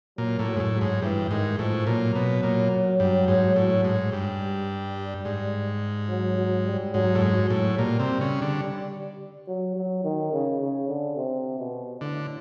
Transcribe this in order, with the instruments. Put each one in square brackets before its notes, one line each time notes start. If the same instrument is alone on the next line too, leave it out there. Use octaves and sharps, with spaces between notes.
[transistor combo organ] A#2 [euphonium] F#3
[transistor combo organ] A2
[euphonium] F#3
[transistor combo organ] G#2
A2
[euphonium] F#3
[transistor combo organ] G#2
[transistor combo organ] G2 [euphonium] E3
[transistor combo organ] G#2 [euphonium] D#3
[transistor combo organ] A2 [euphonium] F3
[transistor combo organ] A#2 [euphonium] F#3
[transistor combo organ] B2
A#2
G2
G#2
A2
G#2
G2
[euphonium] G3
[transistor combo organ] G#2
[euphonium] F#3
F#3
G3
[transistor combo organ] G#2 [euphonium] F#3
[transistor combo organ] A2
G#2
[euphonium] F#3
[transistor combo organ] A2
[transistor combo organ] A#2 [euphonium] G3
[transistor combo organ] C3
C#3
D3
[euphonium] F#3
F#3
D#3
C#3
C#3
D3
C3
B2
[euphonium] A2 [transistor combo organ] D3